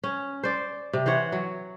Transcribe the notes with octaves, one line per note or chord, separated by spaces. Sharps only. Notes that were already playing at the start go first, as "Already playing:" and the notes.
C#4
C5 D5
C3
E3 C5 C#5 F#5
F#3